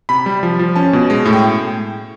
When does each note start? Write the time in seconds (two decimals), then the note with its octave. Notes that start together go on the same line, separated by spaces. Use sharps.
0.09 C3 B5
0.26 G3
0.43 F3
0.59 F3
0.76 C#4 A5
0.93 B2
1.10 G#3
1.25 A2
1.33 G5